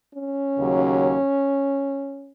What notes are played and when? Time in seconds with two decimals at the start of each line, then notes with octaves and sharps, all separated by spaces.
0.15 C#4
0.57 D#2 C#3 F#3